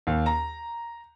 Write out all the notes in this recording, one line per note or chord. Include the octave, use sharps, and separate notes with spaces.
D#2
A#5